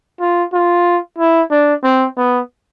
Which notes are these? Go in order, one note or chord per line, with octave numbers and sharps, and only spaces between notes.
F4
F4
E4
D4
C4
B3